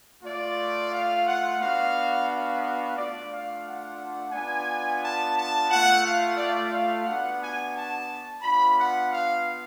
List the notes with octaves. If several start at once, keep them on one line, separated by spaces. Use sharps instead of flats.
A3 F4 D5
F5
F#5
B3 D4 F#4 F5
F5
A3 D4 F4 D5
F5
F#5
B3 D4 F4 G#5
A5
A5
A3 F4 F#5
F5
D5
F5
B3 D4 F#4 F#5
G#5
A5
B3 D4 F4 B5
F#5
F5